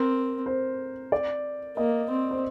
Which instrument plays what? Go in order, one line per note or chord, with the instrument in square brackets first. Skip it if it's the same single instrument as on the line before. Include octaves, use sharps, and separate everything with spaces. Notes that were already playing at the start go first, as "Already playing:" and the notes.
Already playing: [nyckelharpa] C4 [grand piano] A#4
[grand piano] C5
D5
[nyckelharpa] A#3 [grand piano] D#5
[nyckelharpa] C4
[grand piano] C5